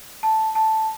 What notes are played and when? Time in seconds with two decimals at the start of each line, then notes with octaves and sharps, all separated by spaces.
0.23 A5
0.55 A5